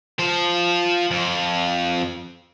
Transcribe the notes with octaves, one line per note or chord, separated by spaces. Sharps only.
F3 C5
F2